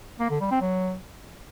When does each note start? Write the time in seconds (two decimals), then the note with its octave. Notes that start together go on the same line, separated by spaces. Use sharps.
0.20 A#3
0.30 D3
0.41 G3
0.51 C4
0.61 F#3